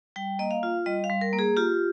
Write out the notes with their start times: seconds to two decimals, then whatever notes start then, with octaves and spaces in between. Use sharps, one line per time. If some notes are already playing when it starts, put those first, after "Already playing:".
0.16 G3 G5
0.39 A#3 D#5
0.51 F5
0.63 F4
0.86 G3 D#5
1.04 F5
1.09 G3
1.21 A#4
1.33 A#3
1.39 G#4
1.57 F4 G4